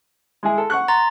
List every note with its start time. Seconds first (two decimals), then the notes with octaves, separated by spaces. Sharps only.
0.43 G#3 E4 G#4
0.58 A4
0.70 F#5 C#6 F#6
0.88 A#5 C6 A6